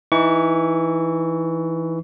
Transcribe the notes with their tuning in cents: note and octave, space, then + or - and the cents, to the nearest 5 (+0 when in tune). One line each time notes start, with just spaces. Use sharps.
E3 +0 D#4 +15 C#6 +30